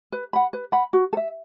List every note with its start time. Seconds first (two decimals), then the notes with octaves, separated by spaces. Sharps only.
0.12 B4
0.33 F#5 B5
0.53 B4
0.72 F#5 B5
0.93 F#4
1.13 A4
1.17 E5